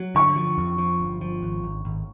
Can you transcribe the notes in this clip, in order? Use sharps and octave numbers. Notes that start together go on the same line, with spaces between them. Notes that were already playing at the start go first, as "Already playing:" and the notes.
Already playing: F#3
D3 C#6
F3
F2
F3
G1
F3
G#1
G#1
G#1